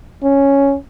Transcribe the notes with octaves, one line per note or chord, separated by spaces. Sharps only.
C#4